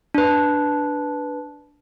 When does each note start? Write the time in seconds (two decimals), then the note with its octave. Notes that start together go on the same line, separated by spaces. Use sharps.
0.14 D4 B4